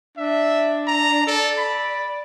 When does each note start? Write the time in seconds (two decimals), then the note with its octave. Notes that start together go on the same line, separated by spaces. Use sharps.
0.17 D4 E5
0.87 A#5
1.27 A4 D5
1.58 B5